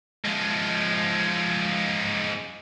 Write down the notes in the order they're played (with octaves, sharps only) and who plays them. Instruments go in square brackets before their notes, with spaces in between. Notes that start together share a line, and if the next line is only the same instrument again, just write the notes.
[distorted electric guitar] F3 G#3